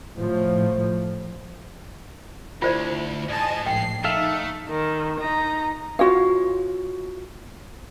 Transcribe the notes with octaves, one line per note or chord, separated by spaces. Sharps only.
A2 F3
D2 E4 F4 C5 D5
G#2 D#5 G#5 A5
A#1 A2 G5 C7
A3 D#4 A4 E5 F5
D#3
D#4 A#5
F4 F#4 C#5 F5